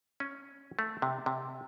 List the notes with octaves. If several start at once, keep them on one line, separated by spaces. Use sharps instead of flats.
C#4
A3
C3
C3